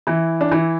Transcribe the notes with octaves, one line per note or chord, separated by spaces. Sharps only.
E3 E4
D4
E3 E4